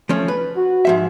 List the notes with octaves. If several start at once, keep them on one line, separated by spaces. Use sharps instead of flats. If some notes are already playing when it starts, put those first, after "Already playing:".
F3 A3 C#4
B4
F#4
G#2 F3 E5